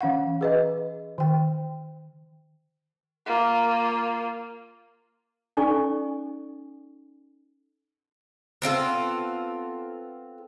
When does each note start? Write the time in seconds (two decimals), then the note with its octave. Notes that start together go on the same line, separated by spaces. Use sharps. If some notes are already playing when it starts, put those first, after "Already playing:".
0.01 E3 C#4 F5 F#5
0.41 G#4 B4 D#5
1.18 D#3 G5
3.26 A#3 F4
5.57 C#4 D#4 A4 D5 G#5 C#6
8.62 B3 C4 F4 A4